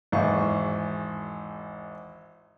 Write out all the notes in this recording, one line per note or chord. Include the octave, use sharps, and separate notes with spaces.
G#1 E2 C#6